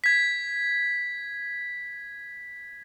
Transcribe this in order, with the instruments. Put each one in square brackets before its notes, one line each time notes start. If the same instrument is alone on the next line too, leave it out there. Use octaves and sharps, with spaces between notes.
[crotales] G#6 B6